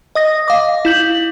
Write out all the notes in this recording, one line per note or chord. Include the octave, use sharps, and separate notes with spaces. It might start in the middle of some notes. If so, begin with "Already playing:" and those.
D#5 D#6 A#6
F5 D6
E4 G6 F#7